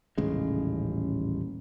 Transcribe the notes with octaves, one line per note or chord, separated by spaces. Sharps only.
D#1 A1 C#3 G#3